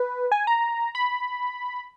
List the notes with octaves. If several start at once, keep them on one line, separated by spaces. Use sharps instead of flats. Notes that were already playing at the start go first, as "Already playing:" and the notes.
Already playing: B4
G#5
A#5
B5